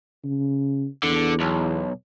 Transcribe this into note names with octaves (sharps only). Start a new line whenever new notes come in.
C#3
E2 D3
B1